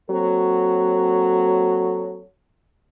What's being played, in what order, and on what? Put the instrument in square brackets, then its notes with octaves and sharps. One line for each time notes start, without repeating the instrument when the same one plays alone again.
[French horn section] F#3 A#3 C4 F#4 A4 C#5